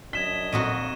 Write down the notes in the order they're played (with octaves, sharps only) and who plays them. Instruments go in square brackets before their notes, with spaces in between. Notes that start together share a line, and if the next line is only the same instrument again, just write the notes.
[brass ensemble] F#2 D4 D#5 [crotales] G#6 E7 G7 [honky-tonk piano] B6
[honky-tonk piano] A#1 [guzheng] F2 D#4 F#4 [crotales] D#7